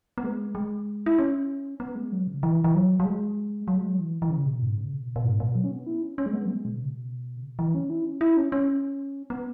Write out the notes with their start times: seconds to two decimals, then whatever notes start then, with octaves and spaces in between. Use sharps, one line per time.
0.18 B3
0.24 G#3
0.55 G#3
1.06 E4
1.19 C#4
1.80 B3
1.95 G#3
2.12 F#3
2.27 C#3
2.43 E3
2.64 E3
2.75 F#3
3.00 F#3
3.05 G#3
3.68 F#3
3.77 G#3
3.86 F#3
3.99 E3
4.22 E3
4.30 C#3
4.46 B2
4.62 G#2
4.77 C#3
4.93 B2
5.16 B2
5.24 G#2
5.40 B2
5.55 F#3
5.64 C#4
5.71 B3
5.87 E4
6.03 C#4
6.18 C#4
6.26 G#3
6.34 B3
6.46 F#3
6.49 G#3
6.65 B2
6.76 C#3
6.85 B2
7.36 C#3
7.42 B2
7.59 E3
7.75 C#4
7.90 E4
8.06 C#4
8.21 E4
8.37 C#4
8.52 C#4
9.30 B3